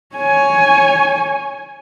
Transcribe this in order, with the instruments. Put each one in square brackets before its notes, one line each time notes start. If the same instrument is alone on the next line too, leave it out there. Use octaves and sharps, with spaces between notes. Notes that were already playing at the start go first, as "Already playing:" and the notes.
[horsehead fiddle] C#5 G#5